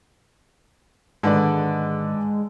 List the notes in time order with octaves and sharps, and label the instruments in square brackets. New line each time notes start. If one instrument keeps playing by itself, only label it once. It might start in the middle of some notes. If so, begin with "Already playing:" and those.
[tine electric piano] G#2 D#3 [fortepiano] D3 B4 D5 [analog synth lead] G#3